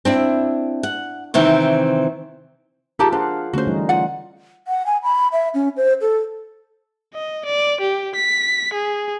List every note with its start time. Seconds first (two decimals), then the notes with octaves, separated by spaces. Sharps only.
0.05 C4 D4 E4
0.83 F#5
1.34 C3 D#3 E3 C4
2.99 D#4 F4 G4 G#4 A#4 A5
3.12 D4 C5 F5 F#5
3.53 D3 A3 C#4 F#4 C5
3.67 E3 G3 D#4
3.89 F4 F#5
4.68 F#5
4.86 G#5
5.03 B5
5.32 E5
5.54 C#4
5.77 C5
6.01 A4
7.14 D#5
7.46 D5
7.81 G4
8.15 B6
8.73 G#4